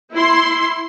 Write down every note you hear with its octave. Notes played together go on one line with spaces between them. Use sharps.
E4 C6